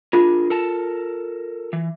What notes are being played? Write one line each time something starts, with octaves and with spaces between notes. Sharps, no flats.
D4 F4 G#4 A#4
A4 A#4 A5
E3